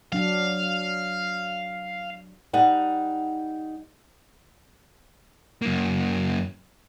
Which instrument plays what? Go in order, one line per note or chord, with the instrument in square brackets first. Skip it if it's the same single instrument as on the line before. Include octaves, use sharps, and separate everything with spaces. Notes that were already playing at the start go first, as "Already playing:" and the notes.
[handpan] F#3 D4 [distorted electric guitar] F5
[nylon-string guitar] G3 D#4 F#5
[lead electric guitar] F#2 A#3